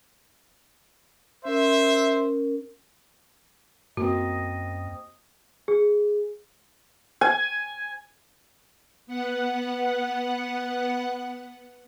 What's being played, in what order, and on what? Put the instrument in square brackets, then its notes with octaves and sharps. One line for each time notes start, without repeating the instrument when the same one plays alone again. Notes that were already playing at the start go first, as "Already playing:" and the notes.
[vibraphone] C#4 A#4 [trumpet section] C5 E5
[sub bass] F#2 [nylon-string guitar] A#3 C4 [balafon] F#4 [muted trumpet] D#5
[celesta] G#4
[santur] G#5
[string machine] B3 F#5